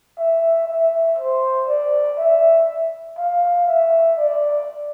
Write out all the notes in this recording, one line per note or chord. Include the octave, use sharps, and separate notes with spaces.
E5
E5
C5
D5
E5
F5
E5
D5